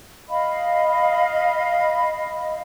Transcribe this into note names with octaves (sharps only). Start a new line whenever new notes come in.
D#5 F5 B5